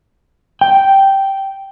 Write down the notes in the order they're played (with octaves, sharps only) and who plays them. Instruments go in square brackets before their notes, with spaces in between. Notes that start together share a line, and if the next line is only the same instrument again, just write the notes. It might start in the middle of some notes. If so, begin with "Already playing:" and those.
[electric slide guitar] G5